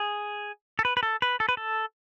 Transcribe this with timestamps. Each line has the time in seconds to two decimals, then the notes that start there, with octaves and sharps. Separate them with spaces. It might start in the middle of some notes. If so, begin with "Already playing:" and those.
Already playing: G#4
0.79 A4
0.85 B4
0.97 B4
1.03 A4
1.22 B4
1.40 A4
1.49 B4
1.57 A4